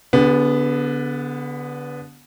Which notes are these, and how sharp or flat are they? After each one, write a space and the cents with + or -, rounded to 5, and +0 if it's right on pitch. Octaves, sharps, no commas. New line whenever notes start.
D3 -25 B3 +0 G4 +35